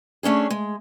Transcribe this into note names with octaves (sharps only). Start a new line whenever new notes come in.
A3 C#4 D4 G#4
G#3